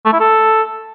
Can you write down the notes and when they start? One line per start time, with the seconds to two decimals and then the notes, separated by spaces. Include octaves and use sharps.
0.06 A3
0.13 E4
0.20 A4